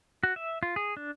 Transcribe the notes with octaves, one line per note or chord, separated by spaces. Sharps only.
F#4
E5
F4
G#4
D4